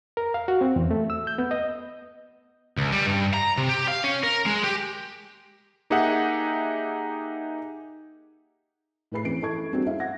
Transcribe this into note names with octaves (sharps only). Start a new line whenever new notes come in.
A#4
F5
F#4
C4
E2
A3
E6
G6
B3
D#5
C#2
G3
G2
A#5
C3
G4
F5
C#4
A#4
G#3
G4
A#3 D#4 G4 G#4 E5 F#5
A2 A3 G#4 B4 B5 C7
E3 C4 C#4 B4 D7
E3 E4 A4 A5 C#6 G#6
G3 A#3 C4 D4 F#4 G#4
C#4 E4 E5 F5
F#5 G#6 A#6